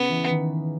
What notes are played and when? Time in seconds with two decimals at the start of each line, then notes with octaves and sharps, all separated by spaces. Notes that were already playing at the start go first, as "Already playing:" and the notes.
Already playing: C#3 B3
0.09 E3
0.30 D#3